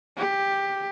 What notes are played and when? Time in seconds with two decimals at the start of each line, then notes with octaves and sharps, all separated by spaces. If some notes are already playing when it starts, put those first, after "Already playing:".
0.17 G4